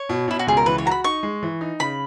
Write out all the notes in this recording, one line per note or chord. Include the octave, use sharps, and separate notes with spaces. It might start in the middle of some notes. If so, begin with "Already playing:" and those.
Already playing: C#5
B2
B2 E4
F#4
C#2 G#4
A#4
E3 B4
C#5
F#4 A#5
B5
D#4 C#6
G#3
E3
D#4
C#3 B5